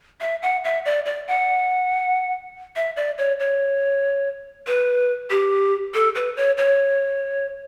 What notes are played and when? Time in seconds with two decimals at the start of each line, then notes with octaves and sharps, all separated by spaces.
0.21 E5
0.42 F#5
0.64 E5
0.85 D5
1.06 D5
1.28 F#5
2.76 E5
2.96 D5
3.18 C#5
3.40 C#5
4.67 B4
5.30 G4
5.94 A4
6.15 B4
6.37 C#5
6.57 C#5